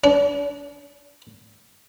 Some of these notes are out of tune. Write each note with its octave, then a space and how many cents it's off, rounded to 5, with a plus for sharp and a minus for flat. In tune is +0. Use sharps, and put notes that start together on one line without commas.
D4 -40